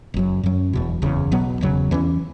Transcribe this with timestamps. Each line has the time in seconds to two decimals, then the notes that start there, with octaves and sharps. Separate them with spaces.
0.14 F#1 F#2 F#3
0.43 F#2 F#3 C#4
0.73 E1 E2 B2
1.02 F#1 E2 C#3
1.32 B1 B2 F#3 B3
1.61 E1 E2 C#3 F#3
1.91 E2 E3 C#4